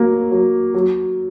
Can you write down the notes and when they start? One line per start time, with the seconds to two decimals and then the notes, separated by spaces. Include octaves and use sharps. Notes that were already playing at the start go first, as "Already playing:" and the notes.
Already playing: F#3 A#3
0.32 F#3
0.74 F#3